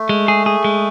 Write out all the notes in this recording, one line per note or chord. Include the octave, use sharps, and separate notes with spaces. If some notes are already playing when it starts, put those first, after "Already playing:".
Already playing: A3
G#3
G#4
G#4
G#3